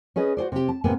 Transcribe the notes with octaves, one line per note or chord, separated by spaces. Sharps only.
C#4 G#4 B4 D#5
F#4 G#4 C5 D5
C3 G4
A5
G#2 C3 A#3 B3 G#5